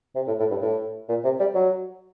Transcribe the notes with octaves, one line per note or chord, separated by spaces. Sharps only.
C3
A2
A2
G2
A2
A#2
C3
G3
F#3